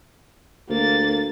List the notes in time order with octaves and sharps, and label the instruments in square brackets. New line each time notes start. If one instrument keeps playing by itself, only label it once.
[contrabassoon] D2 [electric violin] A#3 A6